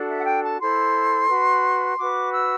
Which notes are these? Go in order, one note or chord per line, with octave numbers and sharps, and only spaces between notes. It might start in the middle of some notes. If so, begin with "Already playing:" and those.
Already playing: D4 F#4 A4
E5
F#5
G5
A5
E4 A4 C5 C6
F#4 B4
F#4 B4 D6
E6